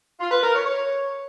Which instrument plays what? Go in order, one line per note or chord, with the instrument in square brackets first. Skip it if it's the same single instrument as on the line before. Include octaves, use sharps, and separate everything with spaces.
[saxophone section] F4
B4
A#4
C#5
C#5